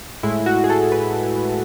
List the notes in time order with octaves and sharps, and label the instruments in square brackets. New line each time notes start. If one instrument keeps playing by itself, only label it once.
[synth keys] A2 G#3 E4
F#4
G#4
A4
B4